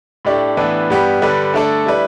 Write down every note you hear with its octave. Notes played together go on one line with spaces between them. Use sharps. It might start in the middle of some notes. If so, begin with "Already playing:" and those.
A2 A3 D4 G4 D5
A2 E3 B3 D4 B4
G2 G3 B3 G4
D3 G3 D4 B4
D3 A3 D4 A4 D5
G3 E4 B4 D5